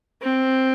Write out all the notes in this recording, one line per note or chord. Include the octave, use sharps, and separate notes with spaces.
C4